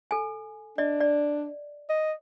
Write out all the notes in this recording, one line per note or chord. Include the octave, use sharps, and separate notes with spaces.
A4 G#5
D4 D5 D#5
D5
D#5